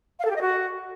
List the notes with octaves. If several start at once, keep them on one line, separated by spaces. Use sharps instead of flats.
F5
A4
G4
D#5
F#4